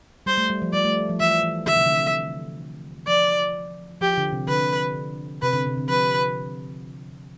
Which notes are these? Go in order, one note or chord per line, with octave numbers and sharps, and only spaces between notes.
G3 C5
A3
G3
F3
G3 D5
A3
F3
E3 E5
E3
D3 E5
C3
D3
F3 D5
F3 G4
D3
C3
D3 B4
C3 B4
D3
C3
D3
F3 B4